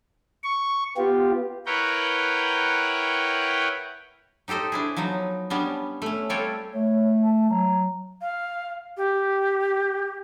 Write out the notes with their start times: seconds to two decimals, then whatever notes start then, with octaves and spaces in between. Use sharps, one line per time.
0.44 C#6
0.97 B3 F4 G4
1.66 E4 A#4 B4 C#5 F#5 G5
4.48 D#4 G4 A4 C5 D#5
4.72 D4 E4 G#4
4.97 F3 F#3 B3 D#4
5.50 G3 B3 C#4 D4
6.02 A3 C#4
6.30 G3 C4 F4 A4 C#5 G5
6.74 A3 C#5
7.24 A5
7.50 F#3 A#5
8.21 F5
8.97 G4